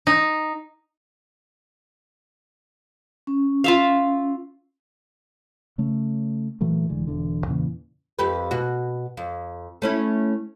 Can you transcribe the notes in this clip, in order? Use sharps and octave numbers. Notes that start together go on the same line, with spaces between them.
D#4
C#4
F4 E5 F5
C#3 A3 C#4
A#2 E3 F#3 A3
F1 D3 E3 G#3
E1 E2 D3
E2 A#2 C#3 E3
F2 G4 B4
B2 F#4
F2
A3 C#4 E4